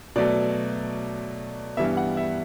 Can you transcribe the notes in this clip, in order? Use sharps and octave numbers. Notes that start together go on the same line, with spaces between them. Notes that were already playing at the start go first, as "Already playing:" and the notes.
B2 F#3 A3 D5
G2 E3 G3 B3 E5
F#5
E5